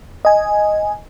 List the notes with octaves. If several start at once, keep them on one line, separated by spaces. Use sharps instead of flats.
D#5 G#5